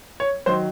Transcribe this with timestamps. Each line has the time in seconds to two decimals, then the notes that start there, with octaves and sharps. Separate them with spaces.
0.20 C#5
0.46 D#3 F#3 C5